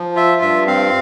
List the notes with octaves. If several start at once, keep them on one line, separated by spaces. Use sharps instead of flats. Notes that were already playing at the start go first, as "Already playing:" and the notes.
Already playing: F3
F4 E5
G2 E5
C4 F5